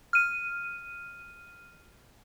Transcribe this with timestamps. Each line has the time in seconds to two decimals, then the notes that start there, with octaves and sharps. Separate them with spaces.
0.13 F6 D#7